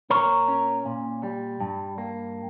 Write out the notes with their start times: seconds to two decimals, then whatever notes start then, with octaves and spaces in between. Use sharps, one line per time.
0.10 A#2 A#4 C#5
0.48 C#4
0.86 A#2
1.23 G3
1.60 G2
1.98 A#3